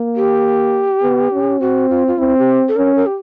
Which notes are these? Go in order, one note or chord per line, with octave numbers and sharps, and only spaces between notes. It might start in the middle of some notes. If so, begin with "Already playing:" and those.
Already playing: A#3
G4
B3
C#4
C4 F#4
F4
F4
C4 E4
G4
A4
C#4 A#4
A#4
G4